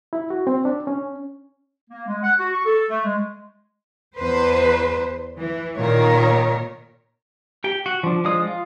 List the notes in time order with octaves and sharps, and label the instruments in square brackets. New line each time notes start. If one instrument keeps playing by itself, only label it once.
[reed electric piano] E4
F#4
C4
D4
C#4
[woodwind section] A#3
G#3
F#5
F#4
C#6
A4
A3
G#3
[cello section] E2 B4 C5
E3
A#2 D#3 A#4 C#5
[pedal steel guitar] G4 G5
F#4
F3 D4
F3 G#3 D5 D#6
F4